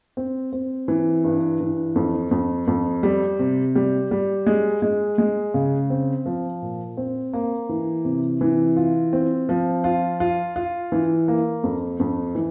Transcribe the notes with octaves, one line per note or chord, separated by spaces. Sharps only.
C4
C4
E3
G2
E3
F2
F2
F2
G3
C3
G3
G3
G#3
G#3
G#3
C#3
C4
F3
A#2
C4
A#3
E3
C3
E3
F4
C4
F3
F4
F4
F4
E3
A#3
F2
F2
E3